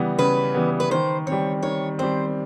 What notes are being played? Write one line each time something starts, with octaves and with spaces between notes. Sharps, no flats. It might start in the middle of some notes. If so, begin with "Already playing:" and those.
Already playing: C#3 E3 G3 B3
C#3 B4
E3 G3 B3
B4
D#3 C5
C4 C#5
G3
D#3 C#5
G3 C4 C5